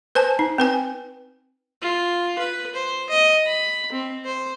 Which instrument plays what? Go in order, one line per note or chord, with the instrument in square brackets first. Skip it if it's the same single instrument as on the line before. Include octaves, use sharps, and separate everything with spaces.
[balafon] B4 C5 G#5 A5
D#4
C4 B4 G#5
[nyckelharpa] F4
B4
C5
D#5
B5
C4
C5